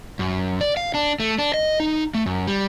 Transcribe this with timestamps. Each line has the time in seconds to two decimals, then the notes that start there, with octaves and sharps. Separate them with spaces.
0.19 F#2
0.61 D5
0.77 F5
0.94 D4
1.20 A3
1.39 D4
1.54 D#5
1.80 D#4
2.14 A3
2.26 F#2
2.47 G3